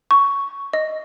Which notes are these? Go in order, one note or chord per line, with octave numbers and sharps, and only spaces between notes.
C#6
D#5